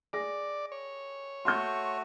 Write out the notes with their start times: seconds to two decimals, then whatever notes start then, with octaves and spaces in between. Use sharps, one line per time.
0.13 G#4 D5 A#6
0.72 C#5
1.45 A3 F#4 C6 G6